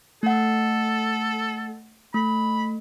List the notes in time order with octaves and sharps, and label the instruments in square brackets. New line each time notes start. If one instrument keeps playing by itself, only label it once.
[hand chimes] A3 F#5 [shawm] A4
[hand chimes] A3 [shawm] B5